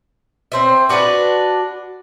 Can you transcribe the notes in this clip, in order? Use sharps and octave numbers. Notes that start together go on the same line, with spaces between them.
C4 C5 E5
D4 F#4 G#4 B4